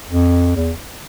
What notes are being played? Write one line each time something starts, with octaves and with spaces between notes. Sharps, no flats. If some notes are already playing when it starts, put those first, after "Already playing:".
F2
E2